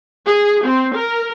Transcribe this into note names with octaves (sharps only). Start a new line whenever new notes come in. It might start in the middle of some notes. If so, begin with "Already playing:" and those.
G#4
C4
A#4